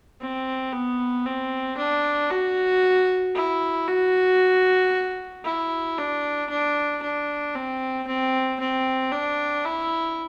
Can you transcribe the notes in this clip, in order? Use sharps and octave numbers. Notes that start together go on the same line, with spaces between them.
C4
B3
C4
D4
F#4
E4
F#4
E4
D4
D4
D4
C4
C4
C4
D4
E4